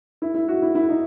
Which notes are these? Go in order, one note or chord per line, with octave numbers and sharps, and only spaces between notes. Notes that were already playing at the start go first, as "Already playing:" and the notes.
E4
E4
F#4
E4
E4
D#4